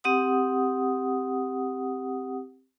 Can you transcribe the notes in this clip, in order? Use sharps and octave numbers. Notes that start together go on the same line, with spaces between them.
C4 G4 F#5 D#6